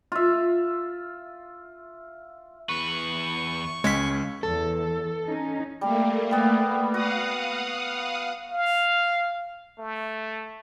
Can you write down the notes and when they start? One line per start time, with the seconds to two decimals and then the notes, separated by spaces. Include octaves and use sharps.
0.12 F4 E5
2.69 E2 B4 C#6
3.84 C#2 G#3 C#4 G#6 B6
4.43 E2 A4
5.26 C#4 D#4
5.81 G3 A3 A#3
6.31 G3 B3
6.94 F#4 F5 F#5 D#6
8.51 F5
9.79 A3